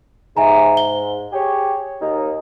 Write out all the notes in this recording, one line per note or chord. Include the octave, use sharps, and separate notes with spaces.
G#2 E5 G#5 A#5
G7
G4 G#4 C#5
D#2 D#4